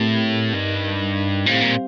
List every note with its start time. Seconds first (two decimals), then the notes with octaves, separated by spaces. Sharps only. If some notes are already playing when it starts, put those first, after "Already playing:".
Already playing: A2 C4 G4 A#4
0.53 G2 D#4 A#4 D#5
1.46 A2 G3 C4 G4 C5 F5
1.61 A#2